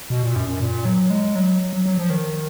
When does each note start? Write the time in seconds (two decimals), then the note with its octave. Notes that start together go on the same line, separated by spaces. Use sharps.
0.10 B2
0.23 A#2
0.36 F#2
0.48 F#2
0.60 A#2
0.85 F#3
1.10 G#3
1.35 F#3
1.73 F#3
1.86 F#3
1.98 F3
2.10 D#3